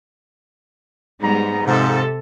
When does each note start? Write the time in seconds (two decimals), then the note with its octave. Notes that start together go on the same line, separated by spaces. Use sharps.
1.21 G#2 G3 G#3 B3 A#5
1.66 G#2 C3 F3 A4